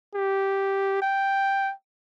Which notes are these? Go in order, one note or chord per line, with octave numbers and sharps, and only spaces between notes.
G4
G5